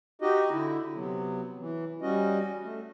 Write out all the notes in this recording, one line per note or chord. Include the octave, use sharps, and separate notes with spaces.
D#4 F#4 G4 D#5
D3 E4
C3 F#3 B3
E3
G3 C#4 F#4 D#5
A3